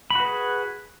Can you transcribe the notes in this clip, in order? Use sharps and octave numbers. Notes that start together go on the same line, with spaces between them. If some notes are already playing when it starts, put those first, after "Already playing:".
F#4 G#4 B4 B5